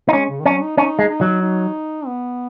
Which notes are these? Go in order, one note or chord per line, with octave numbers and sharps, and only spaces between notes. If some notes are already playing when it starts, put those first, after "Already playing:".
D#4
G#3 C#4
C#3
D#3
F#3 C#4
D#4
C#4 D#4
G#3
D#4
F#3
D#4
B3